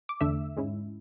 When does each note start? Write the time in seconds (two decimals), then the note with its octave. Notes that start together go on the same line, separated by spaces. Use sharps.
0.09 D6
0.21 E2 D3 A3 D4 E5 E6
0.57 G#2 G#3 C#4 E4